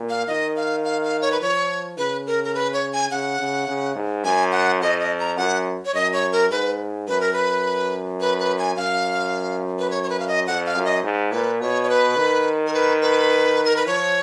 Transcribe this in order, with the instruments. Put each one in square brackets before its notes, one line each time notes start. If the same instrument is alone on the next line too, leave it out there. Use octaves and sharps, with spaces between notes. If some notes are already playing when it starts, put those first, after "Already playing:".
Already playing: [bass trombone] A#2
[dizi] F5
[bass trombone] D#3 [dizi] D#5
[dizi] F5
F5
F5
C#5
B4
[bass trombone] F3 [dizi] C#5
[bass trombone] C#3 [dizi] B4
[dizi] A#4
A#4
B4
C#5
G#5
[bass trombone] C#3 [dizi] F#5
[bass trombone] C#3
C#3
G#2
[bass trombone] F#2 [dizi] G#5
[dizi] F#5
[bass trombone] F2 [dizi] D#5
[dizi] D#5
A#5
[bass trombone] F#2 [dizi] F#5
[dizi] C#5
[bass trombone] F#2 [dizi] D#5
[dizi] C#5
A#4
[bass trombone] G#2 [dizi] B4
[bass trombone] F#2 [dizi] B4
[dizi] A#4
B4
B4
B4
G#5
[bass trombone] F#2 [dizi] F5
[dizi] B4
C#5
C#5
B4
F5
D#5
[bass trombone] F2 [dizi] F#5
[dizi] F5
[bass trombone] F#2
[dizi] D#5
[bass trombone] G#2
[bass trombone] A#2 [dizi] B4
[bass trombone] B2 [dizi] C#5
[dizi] C#5
B4
[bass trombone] D#3
[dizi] A#4
B4
B4
A#4
B4
[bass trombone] F3 [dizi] C#5